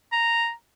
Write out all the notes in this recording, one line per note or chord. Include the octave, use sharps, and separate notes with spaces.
A#5